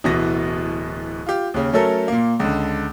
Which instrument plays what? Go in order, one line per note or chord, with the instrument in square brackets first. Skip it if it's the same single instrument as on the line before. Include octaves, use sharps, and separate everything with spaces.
[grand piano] D1 B2 E3 A#6
F4 G4
D#2 C#3
F#3 A3 C#4 A4 A#4
A#2 A#3
C#2 D3